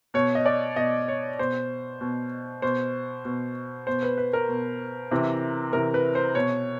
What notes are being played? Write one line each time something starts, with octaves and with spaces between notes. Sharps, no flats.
B2 C#5
D#5
D5
B2 D#5
C#5
B2 C5
B2
B2 C5
B2
B2 C5
B4
B4
A#4
B2
C3 E3
C3 E3 A#4
B4
C5
B2 C#5